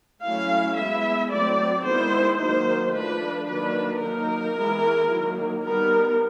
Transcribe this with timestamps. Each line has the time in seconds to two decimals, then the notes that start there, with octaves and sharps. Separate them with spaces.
0.24 F#3 A3 C#4 E4 F5
0.78 G#3 B3 E4 E5
1.32 F#3 A3 C4 D5
1.86 D#3 G#3 B3 E4 C5
2.39 D#3 F#3 A#3 D#4 C5
2.94 F3 A3 D4 B4
3.48 D#3 F#3 A#3 D4 B4
4.02 F#3 A#3 D#4 A#4
4.57 E3 G#3 B3 E4
5.10 D#3 F#3 A#3
5.64 G3 B3 D#4 A#4